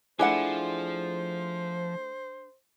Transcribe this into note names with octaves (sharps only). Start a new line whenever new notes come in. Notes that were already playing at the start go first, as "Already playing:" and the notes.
F3 A3 D4 E4 G#4 C5 F#5